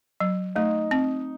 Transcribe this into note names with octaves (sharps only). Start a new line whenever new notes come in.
F#3
A3 D#4
C4